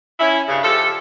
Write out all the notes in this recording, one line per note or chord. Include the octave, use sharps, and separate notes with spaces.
C#4 E4
G2 C#3
F3 G4 A4